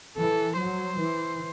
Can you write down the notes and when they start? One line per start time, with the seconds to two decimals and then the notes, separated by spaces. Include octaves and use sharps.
0.17 E3 A4
0.57 F#3 C5
0.97 E3